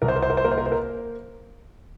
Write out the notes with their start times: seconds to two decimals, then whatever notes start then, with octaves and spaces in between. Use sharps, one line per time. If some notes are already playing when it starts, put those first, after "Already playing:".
0.02 C2 A#4
0.08 C5
0.16 A#4
0.22 C5
0.30 A#4
0.37 C5
0.44 A#3 A#4
0.51 C5
0.58 A#4
0.66 C5
0.72 A#4